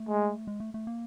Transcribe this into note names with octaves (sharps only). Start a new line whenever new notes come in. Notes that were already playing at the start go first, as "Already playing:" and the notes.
Already playing: A3
G#3
G#3
A3
A3
A#3